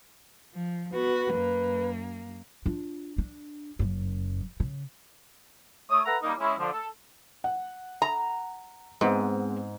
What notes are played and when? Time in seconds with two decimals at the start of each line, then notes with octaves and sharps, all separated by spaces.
0.54 F3
0.94 B3 F#4 B4
1.33 F#2 A#3
2.66 D4 F4
3.18 D4
3.79 F#1 F#2
4.60 C#3
5.90 A3 C#5 D#6
6.06 A4 B4 E5 F#5 A#5
6.22 G3 A#3 D#4 A#4
6.39 G#3 C#4 E4
6.59 D3 F3
6.72 A4
7.44 F#5
8.02 A#5
9.01 G#2 G#3 B3 C4